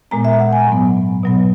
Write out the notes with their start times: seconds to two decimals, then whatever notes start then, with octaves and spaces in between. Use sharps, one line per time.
0.11 A#2 G#3 B3 A#5
0.25 E5
0.40 F#5
0.53 G#5
0.67 G#2 F#3 B3
1.23 B2 F#3 B3